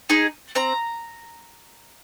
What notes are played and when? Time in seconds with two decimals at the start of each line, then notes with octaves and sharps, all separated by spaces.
0.10 D#4 G#4
0.55 C4 A#5